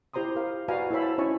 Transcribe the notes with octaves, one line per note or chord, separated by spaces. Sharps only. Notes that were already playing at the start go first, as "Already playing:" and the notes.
E4 G4 C5 A#5 C6 D#6
A#4 F5
F#4 B4 D5 F5 G#5 A#5
E4 A4 C5 C#5 E5 B5
A5
C#4 D#4 E4 C#5 G#5 C#6